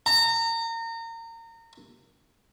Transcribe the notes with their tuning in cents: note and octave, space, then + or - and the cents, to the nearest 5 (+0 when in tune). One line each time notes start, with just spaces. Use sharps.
A#5 -30